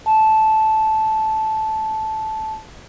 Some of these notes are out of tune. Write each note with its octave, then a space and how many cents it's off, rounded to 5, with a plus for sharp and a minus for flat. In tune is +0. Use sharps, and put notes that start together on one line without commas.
A5 -10